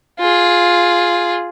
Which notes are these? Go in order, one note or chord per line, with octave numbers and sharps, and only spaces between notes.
F4 G#4